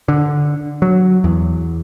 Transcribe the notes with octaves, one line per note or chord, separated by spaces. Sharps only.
D3
F#3
E2